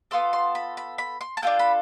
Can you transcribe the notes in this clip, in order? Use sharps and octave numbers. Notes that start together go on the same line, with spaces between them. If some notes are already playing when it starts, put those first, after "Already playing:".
B3 F4 A4 C6
C6
B5
B5
B5
C6
A5
D4 F4 A4 G5
B5